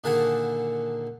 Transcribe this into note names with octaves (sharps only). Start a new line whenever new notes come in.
A#2 D3 D#3 G#4 F#5 A5